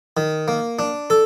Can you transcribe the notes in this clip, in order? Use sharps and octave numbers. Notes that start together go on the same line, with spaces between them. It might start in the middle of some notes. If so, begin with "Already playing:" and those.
D#3
A#3
D4
A4